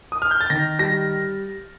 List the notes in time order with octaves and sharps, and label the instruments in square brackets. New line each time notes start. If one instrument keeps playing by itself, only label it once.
[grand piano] D#6
F6
G6
A6
[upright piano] D#3 [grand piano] A#6
[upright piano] G3 [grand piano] A#6